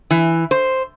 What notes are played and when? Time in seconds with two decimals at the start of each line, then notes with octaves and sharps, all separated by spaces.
0.11 E3
0.51 C5